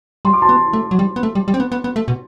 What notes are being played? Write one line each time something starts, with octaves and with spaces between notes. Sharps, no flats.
G3 C6
D6
A5 C6
B3
A3
F#3
G3
B3
A3
G3
G3
C4
B3
B3
B3
A3
B2